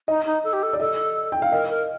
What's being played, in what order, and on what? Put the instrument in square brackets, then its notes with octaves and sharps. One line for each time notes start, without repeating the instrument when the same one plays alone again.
[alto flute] D#4 [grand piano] D#5
[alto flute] D#4
A4
G4
A4
[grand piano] D5
[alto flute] A4 [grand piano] D#5
[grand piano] G5
F5
[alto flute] A#4 [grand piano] D#5
[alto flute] A#4